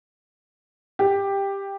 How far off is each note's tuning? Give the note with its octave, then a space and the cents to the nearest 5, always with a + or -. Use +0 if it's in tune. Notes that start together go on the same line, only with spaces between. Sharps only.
G4 +10